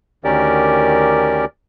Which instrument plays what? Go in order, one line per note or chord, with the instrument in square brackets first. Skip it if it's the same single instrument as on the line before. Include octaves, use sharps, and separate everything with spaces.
[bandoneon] D2 D#3 C#4 G4 A#4 D5